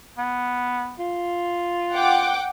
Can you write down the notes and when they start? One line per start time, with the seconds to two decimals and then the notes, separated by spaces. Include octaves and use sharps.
0.18 B3
0.99 F4
1.92 F#5 G5 D6